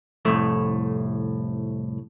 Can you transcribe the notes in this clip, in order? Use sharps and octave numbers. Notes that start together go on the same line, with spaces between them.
C2 F2 A2 A3